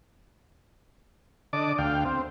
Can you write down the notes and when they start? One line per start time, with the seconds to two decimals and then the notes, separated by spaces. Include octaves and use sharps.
1.53 D3 D5 D#5 A5 D6
1.78 D2 F5 G5
2.05 C4